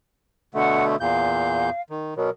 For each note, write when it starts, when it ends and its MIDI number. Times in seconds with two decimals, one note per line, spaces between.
0.55 0.96 47
0.55 0.96 50
0.55 0.96 57
0.55 0.85 78
1.00 1.70 40
1.00 1.70 46
1.00 1.81 77
1.00 1.70 91
1.90 2.14 51
2.17 2.30 47
2.17 2.30 54
2.17 2.30 70